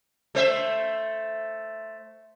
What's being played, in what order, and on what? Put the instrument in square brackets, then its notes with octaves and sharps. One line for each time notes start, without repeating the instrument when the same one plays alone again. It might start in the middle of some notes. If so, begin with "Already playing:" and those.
[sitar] A3 C5 E5